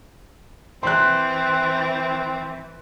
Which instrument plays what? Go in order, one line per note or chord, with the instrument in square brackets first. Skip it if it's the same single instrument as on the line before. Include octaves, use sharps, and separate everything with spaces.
[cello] E3 [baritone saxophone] C4 [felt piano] C6 F#6